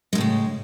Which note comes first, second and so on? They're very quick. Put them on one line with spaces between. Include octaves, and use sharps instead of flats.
G#3 F2 A2 C#3